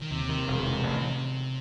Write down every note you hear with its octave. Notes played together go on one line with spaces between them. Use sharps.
D#3
D#2 C3
D#3
E1
D#3
A1